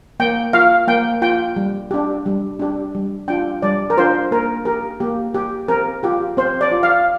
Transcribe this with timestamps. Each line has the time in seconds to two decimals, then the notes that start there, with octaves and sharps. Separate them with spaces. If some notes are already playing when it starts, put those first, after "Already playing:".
0.20 A#3 G5
0.53 F4 F5
0.87 A#3 G5
1.22 F4 G5
1.56 G3
1.91 D4 G4
2.26 G3
2.59 D4 G4
2.95 G3
3.28 D4 F4 G5
3.62 G3 D5
3.90 A#4
3.97 D4 F4 C5
4.31 A#3 A#4
4.65 G4 A#4
5.00 A#3 G4
5.34 G4
5.68 C4 A#4
6.03 F4 G4
6.37 C4 C5
6.61 D5
6.72 F4
6.83 F5